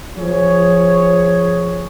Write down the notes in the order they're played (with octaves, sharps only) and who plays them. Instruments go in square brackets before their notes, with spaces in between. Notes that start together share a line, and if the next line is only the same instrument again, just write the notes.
[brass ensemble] F3 G#4 C#5